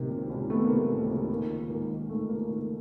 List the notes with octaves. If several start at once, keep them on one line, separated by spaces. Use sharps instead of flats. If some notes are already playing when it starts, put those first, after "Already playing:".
Already playing: C3 D#3 A#3
C#2
C#2
D#3 A3 B3
A#3
C3
A3
C#2
A#3
C#2
D#2 A#3
D#3
D#2 A#3
D#3
D#2 A3
D#3 A#3
D#2 A#3